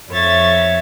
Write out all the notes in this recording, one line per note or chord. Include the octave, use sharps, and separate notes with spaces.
F2 C#5 E5 A6